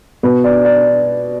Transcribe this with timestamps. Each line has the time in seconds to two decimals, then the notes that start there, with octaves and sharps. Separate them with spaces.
0.23 B2 B4
0.44 D5
0.65 D5